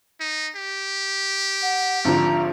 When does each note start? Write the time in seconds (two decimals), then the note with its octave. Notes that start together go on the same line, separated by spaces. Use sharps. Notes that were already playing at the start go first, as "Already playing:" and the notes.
0.20 D#4
0.56 G4
1.62 F#5
2.05 G#1 D3 F3 A#5